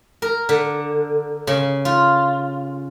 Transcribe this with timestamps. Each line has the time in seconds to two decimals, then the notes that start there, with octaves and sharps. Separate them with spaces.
0.22 A#4
0.49 D3
1.47 C#3
1.85 F4